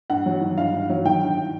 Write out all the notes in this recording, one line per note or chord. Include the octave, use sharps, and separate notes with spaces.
G2 F#5
F#3
D#3
G2 F5
G2
F#3
D#3 G5
G2